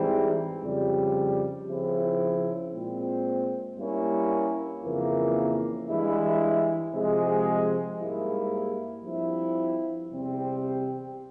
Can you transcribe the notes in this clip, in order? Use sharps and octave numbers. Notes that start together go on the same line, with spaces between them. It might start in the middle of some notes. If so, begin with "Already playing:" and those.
Already playing: G#2 E3 G3 C4 E4
F2 C#3 G3
C#3 F3 C4 E4
A#2 G#3 C4
G2 G3 A#3 C#4 E4
F2 C#3 E3 A#3
G2 E3 G#3 E4
C3 F3 G#3
G#2 G3 A#3 E4
G2 F3 C4 E4
E2 C3 G3 C4